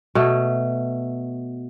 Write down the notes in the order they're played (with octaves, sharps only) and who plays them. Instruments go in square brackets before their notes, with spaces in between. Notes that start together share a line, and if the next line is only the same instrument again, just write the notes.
[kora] B2 A3